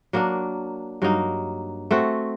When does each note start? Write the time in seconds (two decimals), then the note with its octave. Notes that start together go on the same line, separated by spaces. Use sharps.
0.13 F#3 A#3 D4
1.02 G2 F#3 A#3 D#4
1.91 A3 C4 F#4